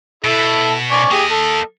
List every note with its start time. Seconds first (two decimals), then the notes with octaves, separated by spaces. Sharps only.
0.24 B2 E4 A4 A5
0.91 D5 G#5 C#6
1.12 A#3 G4 G#4 D#5
1.30 A4